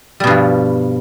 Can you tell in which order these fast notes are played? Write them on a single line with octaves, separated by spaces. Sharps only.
G3 B2 G2 F3